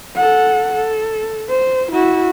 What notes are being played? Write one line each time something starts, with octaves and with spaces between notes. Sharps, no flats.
A4 F#5
A4
C5
E4 F#4